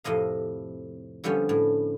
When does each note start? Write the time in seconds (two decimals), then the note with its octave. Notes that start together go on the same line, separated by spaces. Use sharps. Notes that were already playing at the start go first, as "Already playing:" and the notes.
0.04 F2 A2 C3 D#5 F5
1.24 D3 F3 G3 B3 C#4
1.49 A2